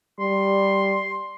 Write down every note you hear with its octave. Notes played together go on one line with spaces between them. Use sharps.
G3 C6